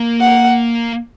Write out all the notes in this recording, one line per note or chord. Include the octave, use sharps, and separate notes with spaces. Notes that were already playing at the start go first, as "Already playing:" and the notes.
Already playing: A#3
F#5